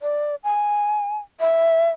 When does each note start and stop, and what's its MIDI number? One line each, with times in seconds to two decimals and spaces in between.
0.02 0.35 74
0.44 1.17 80
1.40 1.90 76